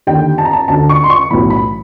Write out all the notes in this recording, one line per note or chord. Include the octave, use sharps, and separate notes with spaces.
D#2 D3 G5
A5
A#5
A5
D2 D3 A5
C#6
C6
C#6
B1 A2 E3 B5
B5